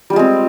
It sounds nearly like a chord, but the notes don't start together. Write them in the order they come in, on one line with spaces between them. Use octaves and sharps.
G3 F4 G#3 C4